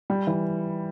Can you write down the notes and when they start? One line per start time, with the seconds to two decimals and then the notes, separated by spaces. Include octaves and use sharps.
0.10 G3
0.27 E3